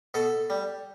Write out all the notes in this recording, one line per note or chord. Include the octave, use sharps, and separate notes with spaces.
B2 A4
G3